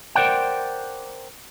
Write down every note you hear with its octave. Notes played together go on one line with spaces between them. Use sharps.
A#4 C5 D5 F#5 G5